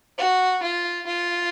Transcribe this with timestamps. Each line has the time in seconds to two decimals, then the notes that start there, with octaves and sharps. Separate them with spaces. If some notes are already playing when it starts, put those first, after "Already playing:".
0.18 F#4
0.63 F4
1.06 F4